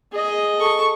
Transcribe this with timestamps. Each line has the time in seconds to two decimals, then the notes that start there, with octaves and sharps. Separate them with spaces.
0.12 G#4 D#5
0.58 A4 C#6